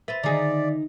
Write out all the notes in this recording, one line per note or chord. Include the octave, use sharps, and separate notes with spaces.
B4 C5 E5 A6
D3 D#3 D#4 G#4 D5